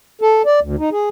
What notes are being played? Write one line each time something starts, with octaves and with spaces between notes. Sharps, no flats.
A4
D5
D2
D#4
G#4